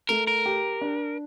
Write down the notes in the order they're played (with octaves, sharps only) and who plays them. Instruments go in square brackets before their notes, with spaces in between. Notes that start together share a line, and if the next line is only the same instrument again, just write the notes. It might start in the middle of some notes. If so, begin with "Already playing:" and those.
[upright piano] A3 [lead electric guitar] A#4
[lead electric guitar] A#4
[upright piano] G4
D4